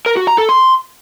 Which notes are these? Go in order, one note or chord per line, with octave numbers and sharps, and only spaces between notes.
A#4
F#4
A#5
A4
C6